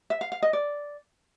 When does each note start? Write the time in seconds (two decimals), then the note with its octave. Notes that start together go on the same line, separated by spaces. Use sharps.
0.10 E5
0.21 F5
0.32 F5
0.42 D#5
0.53 D5